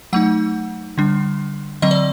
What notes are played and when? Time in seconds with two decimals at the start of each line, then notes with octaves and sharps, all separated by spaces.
0.13 F#3 A3 D#4 F#5
0.98 D3 G3 D4
1.82 D3 F#3 C4 D#5
1.91 D5